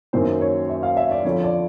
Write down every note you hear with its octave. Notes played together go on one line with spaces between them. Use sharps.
F#2 D#3 F#3 A#3 C#4 C5
C#5
E5
F5
E5
D5
F2 D3 F3 C#5
D5